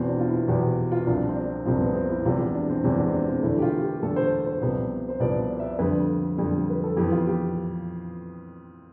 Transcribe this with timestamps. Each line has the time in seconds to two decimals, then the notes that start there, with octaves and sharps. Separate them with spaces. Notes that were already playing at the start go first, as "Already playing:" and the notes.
Already playing: E2 B2 B3 C4
0.09 D4
0.20 F4
0.29 E4
0.48 E2 B2 B3 G4
0.92 F4
1.07 C2 C3 F3 D4
1.29 C4
1.36 D4
1.65 C2 C3 F3 C4
1.81 B3
1.95 C4
2.10 E4
2.25 E1 E2 C3 F4
2.40 D4
2.55 D4
2.70 C4
2.84 E1 E2 C3 D4
2.99 D4
3.07 C4
3.14 D4
3.28 C4
3.42 E2 D3 A3 E4
3.58 G4
3.62 F4
3.82 G4
4.02 E2 D3 A3 A4
4.16 C5
4.46 C5
4.61 C2 C3 F3 B3
5.09 C5
5.20 C2 C3 F3 B3 D5
5.50 D5
5.60 E5
5.64 D5
5.79 F2 D3 G3 B4
6.38 F2 D3 G3
6.70 B4
6.84 A4
6.97 F2 E3 B3 G4
7.12 F4
7.27 G4